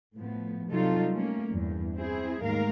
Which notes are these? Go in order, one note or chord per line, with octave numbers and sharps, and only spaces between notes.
A2 F3 B3
C3 F#3 G3 D#4 F4 A4
A3 A#3 C#4
E2 G2
C4 E4 G#4 C5
D#2 G#2 G#3 A3 A#4 F5